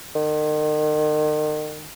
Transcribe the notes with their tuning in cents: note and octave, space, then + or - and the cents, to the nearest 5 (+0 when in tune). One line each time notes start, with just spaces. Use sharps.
D#3 -40